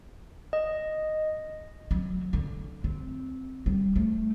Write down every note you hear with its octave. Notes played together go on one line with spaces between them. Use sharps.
D#5
F#3
D3
C4
G3
A3